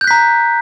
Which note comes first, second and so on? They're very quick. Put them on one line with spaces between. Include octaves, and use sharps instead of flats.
G6 F#6 B6 A#5